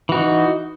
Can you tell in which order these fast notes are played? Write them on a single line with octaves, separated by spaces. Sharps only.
E3 F#4 D#4